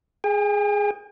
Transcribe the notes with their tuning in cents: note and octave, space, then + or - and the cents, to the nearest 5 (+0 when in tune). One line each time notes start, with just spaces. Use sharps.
G#4 +0 G5 +45